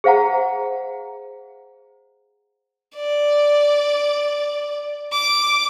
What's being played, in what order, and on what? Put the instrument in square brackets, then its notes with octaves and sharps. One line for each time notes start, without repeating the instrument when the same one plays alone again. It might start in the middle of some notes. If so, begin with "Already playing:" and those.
[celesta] G#4 C5 F5 F#5 A#5
[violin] D5
D6